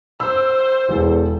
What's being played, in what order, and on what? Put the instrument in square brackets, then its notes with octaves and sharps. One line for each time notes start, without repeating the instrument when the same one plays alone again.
[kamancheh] C5 [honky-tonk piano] E6
[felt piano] E1 E3 A4 [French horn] E2